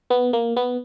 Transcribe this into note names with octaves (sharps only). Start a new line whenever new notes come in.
B3
A#3
B3